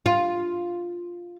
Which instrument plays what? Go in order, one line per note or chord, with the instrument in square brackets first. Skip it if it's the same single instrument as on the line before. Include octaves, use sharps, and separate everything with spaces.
[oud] F4